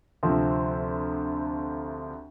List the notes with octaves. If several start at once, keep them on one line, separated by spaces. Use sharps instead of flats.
D2 C3 F3 C4